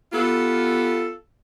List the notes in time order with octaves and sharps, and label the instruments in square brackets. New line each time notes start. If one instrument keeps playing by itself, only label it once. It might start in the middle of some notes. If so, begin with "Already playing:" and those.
[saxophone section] B3 F4 G4 A4